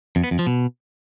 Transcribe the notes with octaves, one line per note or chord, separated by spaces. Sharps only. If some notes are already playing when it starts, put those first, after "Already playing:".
F2
B3
F2
F3
B2